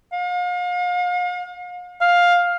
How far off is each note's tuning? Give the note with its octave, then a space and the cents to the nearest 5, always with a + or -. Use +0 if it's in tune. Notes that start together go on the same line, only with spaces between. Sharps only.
F5 +40
F5 +10